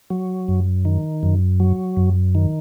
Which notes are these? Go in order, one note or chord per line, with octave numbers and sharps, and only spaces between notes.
F#3
F#2
D#3
F#2
F#3
F#2
D#3